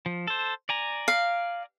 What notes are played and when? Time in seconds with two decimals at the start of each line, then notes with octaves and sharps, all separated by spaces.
0.06 F3
0.27 A4 C5
0.69 D5 G#5 A#5
1.08 F5